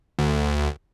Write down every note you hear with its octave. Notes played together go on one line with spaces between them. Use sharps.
D2